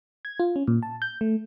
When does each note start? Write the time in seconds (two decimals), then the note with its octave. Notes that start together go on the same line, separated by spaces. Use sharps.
0.25 G#6
0.40 F4
0.56 C#4
0.68 A#2
0.83 A5
1.02 G6
1.21 A3